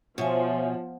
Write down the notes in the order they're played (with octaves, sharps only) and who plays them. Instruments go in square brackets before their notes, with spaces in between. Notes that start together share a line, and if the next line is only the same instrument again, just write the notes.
[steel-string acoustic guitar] B2 [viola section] F3 [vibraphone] C#5 E5 G#5